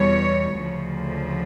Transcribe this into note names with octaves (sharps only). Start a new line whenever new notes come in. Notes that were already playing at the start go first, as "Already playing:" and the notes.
Already playing: E2 B2 G3 C#5
D2 C#3 F3